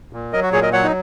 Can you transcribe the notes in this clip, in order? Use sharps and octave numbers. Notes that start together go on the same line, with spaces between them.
A#2
F#3 A#4 D#5
F#4
A#2 G#4 C#5
A#4 D#5
F#3 C#5 F#5
D#4